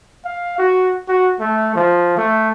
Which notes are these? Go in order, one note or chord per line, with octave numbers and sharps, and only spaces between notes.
F5
F#4
F#4
A3
F3
A3